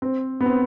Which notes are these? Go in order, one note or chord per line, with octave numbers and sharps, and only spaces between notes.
C4
B3
C4